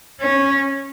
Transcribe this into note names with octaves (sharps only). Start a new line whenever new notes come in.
C#4